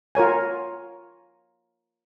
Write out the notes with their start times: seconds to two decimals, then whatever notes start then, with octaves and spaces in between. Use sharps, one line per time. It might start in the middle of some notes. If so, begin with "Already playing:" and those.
0.15 F4 A#4 C#5 G#5